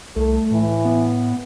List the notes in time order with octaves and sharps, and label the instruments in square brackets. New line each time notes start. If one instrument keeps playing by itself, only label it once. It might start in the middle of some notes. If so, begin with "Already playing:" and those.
[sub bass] C2 [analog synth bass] A3 [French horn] A4
[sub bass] A2 [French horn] E3
[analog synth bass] B3